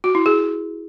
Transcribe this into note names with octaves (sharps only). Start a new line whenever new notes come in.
F#4
E4
G#4